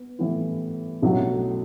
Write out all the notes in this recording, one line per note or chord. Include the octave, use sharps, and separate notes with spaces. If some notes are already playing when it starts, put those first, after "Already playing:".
Already playing: B3
A2 E3 B3 E4
B1 A2 F#3 C#4